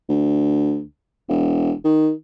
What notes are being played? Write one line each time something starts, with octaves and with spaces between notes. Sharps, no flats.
D2
E1
D#3